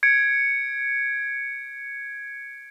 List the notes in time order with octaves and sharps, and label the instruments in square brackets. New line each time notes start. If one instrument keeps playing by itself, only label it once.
[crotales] G#6 C#7 D7